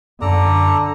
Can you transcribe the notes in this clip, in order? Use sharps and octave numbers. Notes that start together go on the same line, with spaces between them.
F#2 D3 A4 D5 A#5